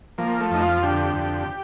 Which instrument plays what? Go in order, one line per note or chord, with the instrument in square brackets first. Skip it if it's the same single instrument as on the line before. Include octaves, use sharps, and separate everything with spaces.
[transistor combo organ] F3 A#3
A3
F2 D#4
F4
D3 G4
F2